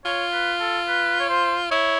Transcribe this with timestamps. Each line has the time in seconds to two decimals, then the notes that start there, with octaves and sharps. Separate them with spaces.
0.05 F4 C#5
0.32 B4
0.60 A4
0.88 B4
1.20 C#5
1.29 C5
1.71 E4 C#5